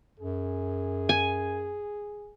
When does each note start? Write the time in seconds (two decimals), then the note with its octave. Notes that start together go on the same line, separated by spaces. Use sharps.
0.20 F#2 G#4
1.09 G#5